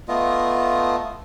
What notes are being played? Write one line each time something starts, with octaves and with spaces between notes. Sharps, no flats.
A3 B3 F4 D#5